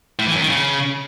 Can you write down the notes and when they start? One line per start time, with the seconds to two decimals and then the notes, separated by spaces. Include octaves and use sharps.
0.19 A2
0.27 E3
0.34 F#2
0.41 D#3
0.49 C#3